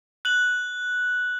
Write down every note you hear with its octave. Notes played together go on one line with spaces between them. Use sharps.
F#6 F#7